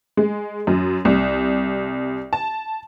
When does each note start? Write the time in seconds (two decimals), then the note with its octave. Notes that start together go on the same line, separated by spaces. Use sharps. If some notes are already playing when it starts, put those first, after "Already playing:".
0.17 G#3
0.67 F#2
1.05 C2
2.33 A5